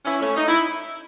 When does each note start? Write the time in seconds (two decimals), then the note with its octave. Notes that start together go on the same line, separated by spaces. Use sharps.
0.05 C#4 E4
0.20 A3 C#4
0.36 D#4
0.47 E4